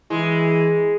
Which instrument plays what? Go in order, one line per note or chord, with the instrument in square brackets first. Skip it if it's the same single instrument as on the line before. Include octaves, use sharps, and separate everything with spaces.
[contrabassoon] E3 [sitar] G#3